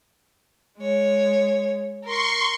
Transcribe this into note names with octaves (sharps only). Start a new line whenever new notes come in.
G#3 C#5
A#4 C6 C#6